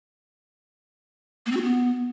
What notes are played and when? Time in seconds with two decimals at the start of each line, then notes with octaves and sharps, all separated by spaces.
1.46 A#3
1.51 C4
1.57 F#4
1.62 B3